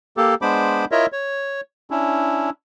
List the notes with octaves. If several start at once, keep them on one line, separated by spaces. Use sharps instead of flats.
A#3 G4 A4
G#3 B3 D4 C5 B5 D6
E4 F4 A#4 C#5 D#5 E5
C#5
C#4 D4 E4